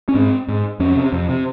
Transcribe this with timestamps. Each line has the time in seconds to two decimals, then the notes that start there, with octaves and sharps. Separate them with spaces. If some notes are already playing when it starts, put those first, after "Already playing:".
0.09 C#4
0.14 G#2 C4
0.48 G#2
0.80 F2 C#4
0.96 C3
1.13 F2
1.29 C3